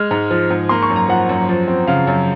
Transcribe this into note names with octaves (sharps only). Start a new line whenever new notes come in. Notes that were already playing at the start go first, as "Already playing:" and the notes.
Already playing: G#3 F6
G#2
F3
G#2
A#3 C6
C#6
F#2
A#5
F3 F#5
F#2
F3
C4
C#3 F5
F#2